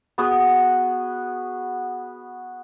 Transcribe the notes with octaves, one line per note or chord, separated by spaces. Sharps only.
B3 F#4 G#4